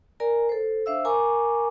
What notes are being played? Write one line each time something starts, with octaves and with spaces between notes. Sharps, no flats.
A#4 D5 G#5 A#5
A4 C5
D4 C5 E5 F5 E6
A#4 G#5 A#5 C#6 D6